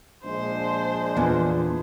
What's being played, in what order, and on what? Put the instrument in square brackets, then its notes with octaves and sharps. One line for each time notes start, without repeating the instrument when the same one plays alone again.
[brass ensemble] A#1 G#3 D4 [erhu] C5
[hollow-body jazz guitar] E2 A#2 [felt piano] B3 F4 G#5